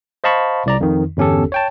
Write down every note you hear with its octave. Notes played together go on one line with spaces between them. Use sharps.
C5 D#5 F5 A5 B5 C#6
C2 D5 A#5
F2 D#3
G1 E2 C#4 G4 A4
C#5 G5 A5